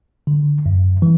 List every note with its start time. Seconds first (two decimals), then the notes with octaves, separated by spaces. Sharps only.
0.27 D3
0.66 F#2
1.02 E3